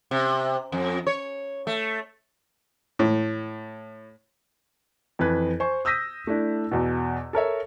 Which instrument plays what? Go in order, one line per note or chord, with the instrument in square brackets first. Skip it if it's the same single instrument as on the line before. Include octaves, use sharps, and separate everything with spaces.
[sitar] C3
F2
C#5
A3
[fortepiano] A2
[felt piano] F2 E3 B4 G#6
C5 G#5 C#6
D#6 E6 G6 A#6 B6 D#7
A3 D4 E4
E2 B2
A4 A#4 C#5 E5